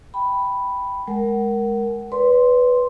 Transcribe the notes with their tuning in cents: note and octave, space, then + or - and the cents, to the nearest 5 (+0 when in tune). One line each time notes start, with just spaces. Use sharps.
G5 +0 B5 +0
G#3 +5 A#4 +0 F#5 +25
B4 +5 D5 -40 C6 +0